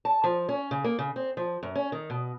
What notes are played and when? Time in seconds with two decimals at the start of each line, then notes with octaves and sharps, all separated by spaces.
0.05 A5
0.24 F3
0.49 C#4
0.71 C#3
0.84 A#3
0.99 C#3
1.16 C4
1.37 F3
1.63 F#2
1.76 C#4
1.92 D#3
2.10 B2